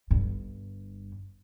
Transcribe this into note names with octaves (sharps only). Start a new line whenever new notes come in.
G1 G2